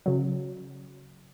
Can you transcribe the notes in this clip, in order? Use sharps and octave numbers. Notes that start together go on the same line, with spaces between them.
C#3 F#3